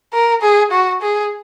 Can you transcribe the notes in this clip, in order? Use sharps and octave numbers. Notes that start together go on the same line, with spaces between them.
A#4
G#4
F#4
G#4